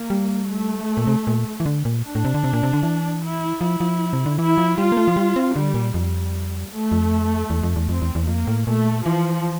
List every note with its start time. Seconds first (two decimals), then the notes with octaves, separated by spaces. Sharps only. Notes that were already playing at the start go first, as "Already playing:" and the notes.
Already playing: A#3
0.10 G3
0.49 A3
0.97 A#2
1.07 C3
1.27 A#2
1.60 E3
1.66 D3
1.85 A#2
2.05 D4
2.15 A2
2.25 C3
2.34 D3
2.44 C3
2.53 A#2
2.63 C3
2.73 D3
2.83 E3
3.22 E4
3.60 F3 E4
3.80 F3
4.13 C3
4.26 D3
4.39 E3 E4
4.58 F3
4.78 G3 F4
4.92 A#3
4.97 A3
5.08 F3
5.16 G3
5.36 C4
5.55 D3 G3
5.74 A#2
5.94 F2 G3
6.72 A3
6.92 F2
7.50 E2
7.63 F2
7.76 E2
7.89 F2 C4
8.02 E2
8.15 E2
8.27 F2 A#3
8.47 A2
8.67 A#2 A3
9.06 E3 F3